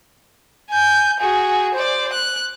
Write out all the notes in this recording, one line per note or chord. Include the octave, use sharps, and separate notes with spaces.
G#5 G6
F#4 G#4
C5 D5
F#6